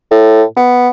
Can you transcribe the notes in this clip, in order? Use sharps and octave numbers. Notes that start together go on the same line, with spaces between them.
A2
B3